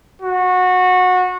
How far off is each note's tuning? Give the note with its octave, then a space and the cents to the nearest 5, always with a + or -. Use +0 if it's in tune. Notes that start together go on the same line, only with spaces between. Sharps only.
F#4 -20